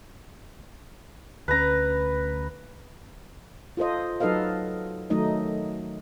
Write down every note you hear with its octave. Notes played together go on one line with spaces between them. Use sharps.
D2 C#4 B4 A#5
F4 A4 C5 D#5
F#3 D#4 A4 B4 D#5 F5
D#3 F#3 A3 D#4 D#5